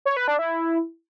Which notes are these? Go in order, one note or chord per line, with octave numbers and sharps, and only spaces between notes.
C#5
B4
D4
E4